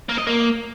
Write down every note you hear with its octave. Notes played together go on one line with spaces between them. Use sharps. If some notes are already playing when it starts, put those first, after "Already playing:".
A#3
D#5
A#3